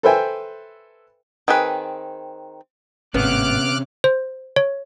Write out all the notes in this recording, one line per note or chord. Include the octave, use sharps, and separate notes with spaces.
A4 B4 C5 E5 G5 G#5
D#3 C4 G#4 B4
G#1 A2 C3 B3 C#4 D6 F6 F#6
C5
C#5